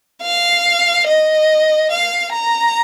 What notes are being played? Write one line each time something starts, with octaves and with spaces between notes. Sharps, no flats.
F5
D#5
F5
A#5